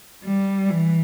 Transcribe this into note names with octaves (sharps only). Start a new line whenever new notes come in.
G3
E3